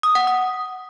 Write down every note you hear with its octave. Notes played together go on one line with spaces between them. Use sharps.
D#6
F#5
D#6